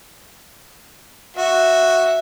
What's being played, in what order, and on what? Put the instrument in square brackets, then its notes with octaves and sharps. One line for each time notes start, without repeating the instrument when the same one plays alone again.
[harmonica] F#4 [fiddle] E5